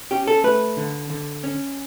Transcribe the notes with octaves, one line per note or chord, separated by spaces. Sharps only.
C#4 G4
A4
A3 B4
D3
D3
C#4